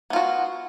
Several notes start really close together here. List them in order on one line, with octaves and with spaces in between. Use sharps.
B3 F4 F#4